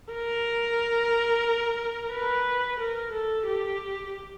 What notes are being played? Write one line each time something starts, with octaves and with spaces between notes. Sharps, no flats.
A#4
B4
A#4
A4
G4